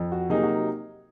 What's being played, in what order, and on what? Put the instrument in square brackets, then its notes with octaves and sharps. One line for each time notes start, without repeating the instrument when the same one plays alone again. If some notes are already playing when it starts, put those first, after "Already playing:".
Already playing: [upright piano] F2
F#4
C3 F#3 A#3 D#4 G#4
F#4